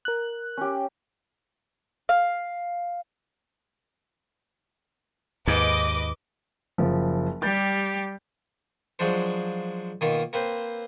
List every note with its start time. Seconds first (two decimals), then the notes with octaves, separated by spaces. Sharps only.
0.05 A#4 F#6
0.57 C#4 G4
2.09 F5
5.47 D#2 G#2 B4 D#5 D6
6.78 F#1 F3
7.42 G3 G4 G6 A6
8.99 F3 F#3 G#3 D4 C5
10.01 B2 D#3 A#3 F4
10.33 A#3 C4 B4 C5